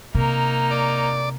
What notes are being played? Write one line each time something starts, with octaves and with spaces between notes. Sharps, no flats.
C3 A#3 D#4
D5